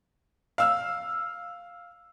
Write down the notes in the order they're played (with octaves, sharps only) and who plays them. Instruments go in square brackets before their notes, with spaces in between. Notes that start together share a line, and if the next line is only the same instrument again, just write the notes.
[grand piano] F5 E6 F6